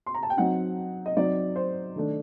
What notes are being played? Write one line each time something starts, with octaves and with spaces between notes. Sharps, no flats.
C6
A#5
A5
G5
F#3 C4 D#4 F#5
D#5
F#3 C4 D#4 D5
C5
D#3 A3 D4